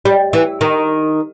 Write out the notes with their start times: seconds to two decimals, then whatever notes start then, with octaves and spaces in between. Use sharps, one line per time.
0.05 G3
0.33 E3
0.61 D#3